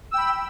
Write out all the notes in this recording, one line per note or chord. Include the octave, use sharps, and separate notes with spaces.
G5 B5 E6